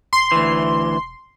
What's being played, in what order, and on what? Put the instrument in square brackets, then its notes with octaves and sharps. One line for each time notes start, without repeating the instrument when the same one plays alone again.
[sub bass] E1 [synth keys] C6
[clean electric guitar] D2 E3